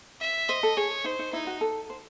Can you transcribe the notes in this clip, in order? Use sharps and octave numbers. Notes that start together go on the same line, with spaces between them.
E5
C5 D#5
A4
G#4 C#5
D#4 C5
D#4
D#4 E4
F#4
A4
C5